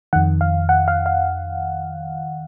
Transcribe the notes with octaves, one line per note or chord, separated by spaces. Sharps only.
F2 D#3 F#5
F5
F#5
F5
F5